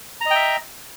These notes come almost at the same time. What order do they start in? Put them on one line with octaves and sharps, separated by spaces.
A#5 D#5 G5 E5